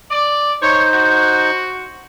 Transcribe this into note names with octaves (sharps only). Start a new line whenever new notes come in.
D5
D#4 C5 C#5
F#4